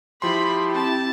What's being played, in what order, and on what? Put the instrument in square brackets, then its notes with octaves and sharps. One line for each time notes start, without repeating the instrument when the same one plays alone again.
[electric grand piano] F3 C6 [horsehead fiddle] E4 G4 [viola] B5
[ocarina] C4 [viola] A5